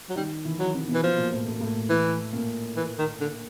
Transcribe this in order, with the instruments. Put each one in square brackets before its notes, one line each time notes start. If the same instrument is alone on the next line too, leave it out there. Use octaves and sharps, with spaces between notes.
[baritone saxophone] F#3
[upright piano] D#3 D#4 [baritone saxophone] G3
[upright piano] E3 E4
[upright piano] D#3 D#4 [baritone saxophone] F#3
[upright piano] C3 C4
B2 B3
[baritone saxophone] E3
[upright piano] B2 B3 [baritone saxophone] F3
[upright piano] A#2 A#3
A2 A3
A3
A#3
A2 A3
[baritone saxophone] E3
[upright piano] A#2 A#3
[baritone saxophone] E3
D#3
D3